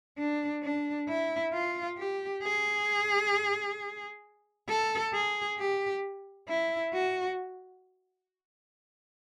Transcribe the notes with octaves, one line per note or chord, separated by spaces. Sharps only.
D4
D4
E4
F4
G4
G#4
A4
G#4
G4
E4
F#4